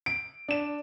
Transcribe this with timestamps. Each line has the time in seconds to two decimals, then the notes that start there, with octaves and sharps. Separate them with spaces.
0.06 D7
0.48 D4 E7